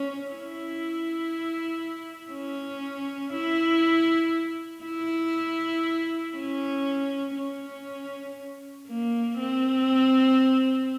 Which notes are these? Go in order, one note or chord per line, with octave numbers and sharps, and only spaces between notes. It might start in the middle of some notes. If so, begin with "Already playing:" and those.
Already playing: C#4
E4
C#4
E4
E4
C#4
C#4
A#3
C4